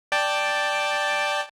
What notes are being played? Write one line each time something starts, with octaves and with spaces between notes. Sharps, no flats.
D5 G5 A5